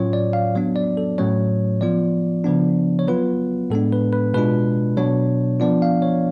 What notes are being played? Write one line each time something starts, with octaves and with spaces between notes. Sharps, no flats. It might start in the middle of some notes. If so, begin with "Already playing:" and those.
Already playing: A2 F#3 C#4 F4 C#5
D5
F5
F#3 B3 D4
D5
A4
A2 F#3 A3 C#4 C#5
F3 B3 F4 D5
C#3 F3 B3 D4
C#5
F#3 B3 F4 B4
A2 G#3 B3 D4 A4
B4
B4
B2 G#3 D4 F4 B4
B2 F#3 B3 D4 C#5
F3 B3 D4 F4 D5
F5
C#5